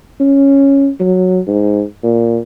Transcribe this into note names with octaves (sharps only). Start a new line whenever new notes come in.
C#4
F#3
G#2
A#2